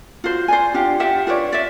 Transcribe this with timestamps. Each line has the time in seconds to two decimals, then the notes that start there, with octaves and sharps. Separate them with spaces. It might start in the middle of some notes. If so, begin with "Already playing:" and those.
0.24 F4 F#4 C5
0.48 C5 D5 G#5
0.74 D4 F4 G4 F#5
1.00 F4 G4 E5 F#5
1.27 F4 B4 C#5 D5
1.52 D5 E5